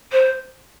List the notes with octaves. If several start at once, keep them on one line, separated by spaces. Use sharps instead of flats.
C5